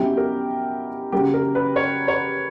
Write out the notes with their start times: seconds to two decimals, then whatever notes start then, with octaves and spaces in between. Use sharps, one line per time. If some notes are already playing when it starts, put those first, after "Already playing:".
Already playing: B2 F#3 C#4 E4 G4
0.17 A#4
1.12 C#3 F#3 A#3 G4
1.34 A#4
1.55 B4
1.76 C#5
2.08 C#5